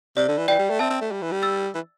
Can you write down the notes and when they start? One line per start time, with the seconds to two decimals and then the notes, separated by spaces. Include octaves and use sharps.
0.16 C3 D5
0.28 D3
0.38 E3
0.48 E3 D5 G5
0.59 G3
0.70 A3
0.79 C4 E5 A5
0.90 C4
1.01 A3
1.11 G3
1.22 E3
1.32 G3
1.42 E6 A6
1.75 E3